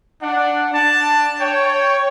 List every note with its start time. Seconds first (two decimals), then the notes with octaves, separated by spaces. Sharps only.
0.22 D4 F#5
0.72 D4 A5
1.41 C#5 G5